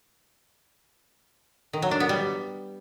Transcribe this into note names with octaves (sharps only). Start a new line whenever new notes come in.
D#3
F#3
D4
B3
G3